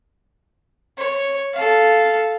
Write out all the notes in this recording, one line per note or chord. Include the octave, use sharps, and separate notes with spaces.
C#5
A4 F5